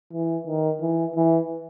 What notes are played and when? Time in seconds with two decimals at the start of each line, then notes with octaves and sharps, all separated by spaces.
0.14 E3
0.47 D#3
0.81 E3
1.16 E3